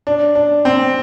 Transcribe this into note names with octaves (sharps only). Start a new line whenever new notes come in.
D4
D4
C4